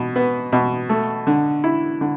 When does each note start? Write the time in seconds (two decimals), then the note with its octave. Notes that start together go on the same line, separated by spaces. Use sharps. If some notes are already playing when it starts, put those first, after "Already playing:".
Already playing: B2
0.16 B3
0.53 B2
0.89 A3
1.27 D3
1.64 E4
2.01 D3